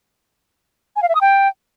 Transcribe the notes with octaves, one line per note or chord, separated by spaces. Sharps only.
G#5
F5
E5
D#6
G5